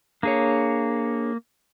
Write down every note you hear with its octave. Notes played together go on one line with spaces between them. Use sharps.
A#3 D4 G#4 C#5